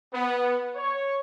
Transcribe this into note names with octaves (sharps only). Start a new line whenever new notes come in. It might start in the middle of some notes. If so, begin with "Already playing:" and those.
B3
C#5